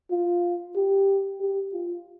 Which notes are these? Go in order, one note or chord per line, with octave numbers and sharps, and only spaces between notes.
F4
G4
G4
F4